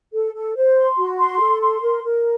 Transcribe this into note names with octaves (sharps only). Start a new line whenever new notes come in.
A4
A4
C5
C6
F#4
C6
A4
C6
A#4
A#4